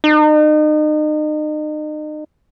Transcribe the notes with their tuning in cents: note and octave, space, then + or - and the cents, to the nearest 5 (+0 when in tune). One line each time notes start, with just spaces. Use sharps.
D#4 -35